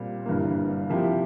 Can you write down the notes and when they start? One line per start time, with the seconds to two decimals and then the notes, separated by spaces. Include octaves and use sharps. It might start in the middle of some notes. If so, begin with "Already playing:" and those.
Already playing: A#2 G3 C4
0.26 G1 G2 E3 A#3
0.89 C3 F3 A#3 E4 G4